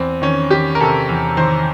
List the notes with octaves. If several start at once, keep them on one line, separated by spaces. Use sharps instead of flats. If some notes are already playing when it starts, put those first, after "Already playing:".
Already playing: E2 C4
D#3 C#4
D#3 G4
A#4
C3 A4
E2
D#3 C5